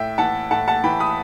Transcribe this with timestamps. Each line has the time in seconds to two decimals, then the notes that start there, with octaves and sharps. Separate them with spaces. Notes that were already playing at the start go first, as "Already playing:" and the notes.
Already playing: A2 E5 G5
0.18 E3 F#5 A5
0.51 A2 F#5 A5
0.68 F#5 A5
0.84 E3 G5 B5
1.00 B5 D#6